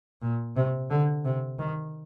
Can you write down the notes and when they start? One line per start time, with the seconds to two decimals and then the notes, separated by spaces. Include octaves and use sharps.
0.22 A#2
0.56 C3
0.90 D3
1.25 C3
1.59 D#3